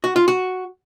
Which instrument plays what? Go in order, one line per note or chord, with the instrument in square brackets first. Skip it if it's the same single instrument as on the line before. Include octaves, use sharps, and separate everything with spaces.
[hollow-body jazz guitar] F#4
F4
F#4